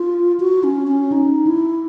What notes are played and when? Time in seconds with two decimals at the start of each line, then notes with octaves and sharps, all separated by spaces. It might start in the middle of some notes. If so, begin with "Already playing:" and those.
Already playing: F4
0.40 F#4
0.64 C#4
0.87 C#4
1.12 D#4
1.47 E4